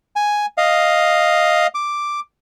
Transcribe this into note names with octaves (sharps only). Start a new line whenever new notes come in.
G#5
D#5 F5
D6